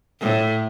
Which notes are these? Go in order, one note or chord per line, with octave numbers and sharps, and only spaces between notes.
A2